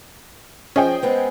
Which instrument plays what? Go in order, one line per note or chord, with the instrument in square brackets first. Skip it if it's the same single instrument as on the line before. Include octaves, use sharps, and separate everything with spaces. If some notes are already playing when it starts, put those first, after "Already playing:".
[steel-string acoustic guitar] F3 [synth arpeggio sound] C#4 [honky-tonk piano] G#4 D#5 G5
[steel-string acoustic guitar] G#3 B3 C4